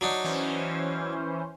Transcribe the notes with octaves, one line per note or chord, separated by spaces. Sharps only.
F#3 D4 D#4
E3 C#4 C5